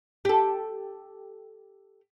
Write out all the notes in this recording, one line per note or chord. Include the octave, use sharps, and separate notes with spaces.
G4 A4